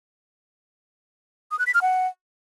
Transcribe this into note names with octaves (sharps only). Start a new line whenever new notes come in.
D#6
F#6
B6
F6
F#5